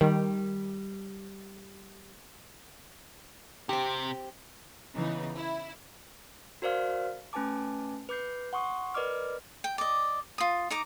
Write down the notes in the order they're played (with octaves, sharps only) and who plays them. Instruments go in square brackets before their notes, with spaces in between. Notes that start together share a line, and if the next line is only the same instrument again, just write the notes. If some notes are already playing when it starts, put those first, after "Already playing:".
[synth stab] D#3 [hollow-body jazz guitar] G3
[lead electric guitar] C3 [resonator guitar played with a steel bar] C4 G4
[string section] C#3 E3 B3 D#4
E4
[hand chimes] F#4 A#4 C5 D5 F5 F6
A3 C#4 B4 G#5 A5 D6
B4 D6 G6 C7
F#5 C6 C#6 D#6
A#4 B4 D5 D#5 D6 F6
[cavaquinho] G5
D5 D#5
F4 D#6
D#4 A#5 D6